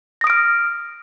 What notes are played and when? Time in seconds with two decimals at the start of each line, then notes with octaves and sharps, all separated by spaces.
0.21 A#6
0.24 D#6
0.27 D7
0.30 F6